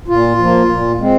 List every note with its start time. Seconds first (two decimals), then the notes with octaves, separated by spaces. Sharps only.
0.08 A#2 F4
0.38 F3 A#3
0.69 A#2
0.98 G#3 C4